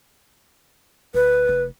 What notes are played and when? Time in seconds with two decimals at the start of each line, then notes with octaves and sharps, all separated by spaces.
1.14 D1 B4
1.49 F1